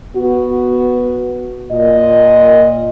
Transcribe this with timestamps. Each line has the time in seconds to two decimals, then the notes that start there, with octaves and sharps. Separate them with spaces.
0.16 B3 F#4
1.72 A#2 D#5